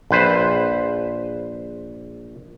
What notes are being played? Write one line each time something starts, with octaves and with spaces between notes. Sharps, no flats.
A#1 B4 C5